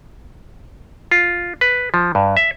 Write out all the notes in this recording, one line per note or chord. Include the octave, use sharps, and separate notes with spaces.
F4
B4
F3
G2
E5